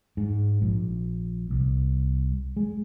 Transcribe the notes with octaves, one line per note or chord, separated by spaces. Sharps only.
G#2
A#1
C2
G#3